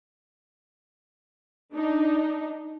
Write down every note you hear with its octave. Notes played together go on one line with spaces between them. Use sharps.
D4 D#4